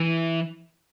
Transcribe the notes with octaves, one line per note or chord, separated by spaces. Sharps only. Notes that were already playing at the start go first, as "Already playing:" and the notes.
Already playing: E3